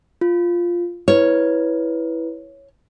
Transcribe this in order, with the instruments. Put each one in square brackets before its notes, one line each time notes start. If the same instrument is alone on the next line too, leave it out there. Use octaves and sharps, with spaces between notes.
[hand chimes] F4
[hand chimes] E4 B4 [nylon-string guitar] C#5